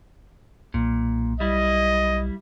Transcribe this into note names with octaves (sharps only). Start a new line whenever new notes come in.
B1 A#2
G3 E4 D#5